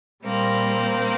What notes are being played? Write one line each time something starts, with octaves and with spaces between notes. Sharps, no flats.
A#2 G3 A#3 C4